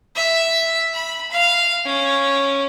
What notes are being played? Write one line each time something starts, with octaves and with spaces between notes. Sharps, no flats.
E5
B5
F5
C#4